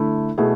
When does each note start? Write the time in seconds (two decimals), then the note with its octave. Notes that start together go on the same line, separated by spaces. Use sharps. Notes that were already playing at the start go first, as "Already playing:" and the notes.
Already playing: D3 A3 E4
0.38 B2 A3 E4 G#4